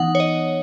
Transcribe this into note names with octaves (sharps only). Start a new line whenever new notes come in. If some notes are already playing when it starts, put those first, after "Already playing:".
Already playing: E3 B3 D#4 F#5 D#6
C#5
D#5